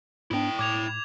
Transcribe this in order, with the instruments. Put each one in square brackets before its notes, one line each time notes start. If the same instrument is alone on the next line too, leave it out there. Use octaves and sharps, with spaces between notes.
[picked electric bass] G#2 B3 D4 [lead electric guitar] E4 G5
[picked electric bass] A2 [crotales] D6 G#6 F7